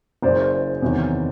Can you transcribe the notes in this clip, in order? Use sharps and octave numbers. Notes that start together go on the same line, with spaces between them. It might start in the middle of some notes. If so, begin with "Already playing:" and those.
F#1 F#2 C#3 C5 D5
E2 C3 D#3 F#3